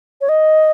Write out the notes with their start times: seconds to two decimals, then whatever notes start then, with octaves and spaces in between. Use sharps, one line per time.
0.21 C#5
0.29 D#5